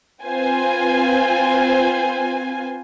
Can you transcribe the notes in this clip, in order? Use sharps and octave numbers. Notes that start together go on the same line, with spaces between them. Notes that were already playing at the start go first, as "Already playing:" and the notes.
C4 F4 B4 C5 G#5